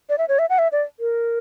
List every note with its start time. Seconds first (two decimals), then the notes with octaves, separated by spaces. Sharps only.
0.09 D5
0.18 E5
0.28 C#5
0.39 E5
0.50 F#5
0.59 E5
0.72 D5
1.00 A#4